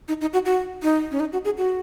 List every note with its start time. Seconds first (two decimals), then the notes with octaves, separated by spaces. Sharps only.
0.08 D#4
0.21 D#4
0.33 F#4
0.45 F#4
0.83 D#4
1.11 C#4
1.20 D#4
1.33 F#4
1.45 G#4
1.58 F#4